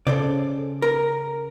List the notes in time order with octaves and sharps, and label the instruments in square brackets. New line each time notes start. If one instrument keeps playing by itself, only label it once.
[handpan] C#3 [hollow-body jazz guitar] A4 C5 D5
[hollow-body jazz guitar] A#4